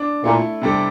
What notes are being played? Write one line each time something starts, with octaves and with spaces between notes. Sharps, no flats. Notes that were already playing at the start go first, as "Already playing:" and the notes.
Already playing: D4
A#2 A3 E4 A4
C3 G3 D4 A4